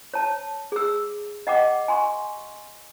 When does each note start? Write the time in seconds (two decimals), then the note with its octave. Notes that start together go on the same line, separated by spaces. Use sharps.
0.14 C#5 A5
0.72 G#4 E6
1.47 D#5 F#5 G5 D6
1.88 G#5 C6 C#6